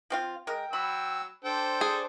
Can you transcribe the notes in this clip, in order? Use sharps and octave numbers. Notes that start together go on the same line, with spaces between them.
F3 C4 F4
G#3 A#4 G5
F#3 B5 E6
D4 A4 C5 G5
G#4